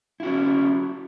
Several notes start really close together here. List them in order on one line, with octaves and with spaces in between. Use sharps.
E4 F#4 C#4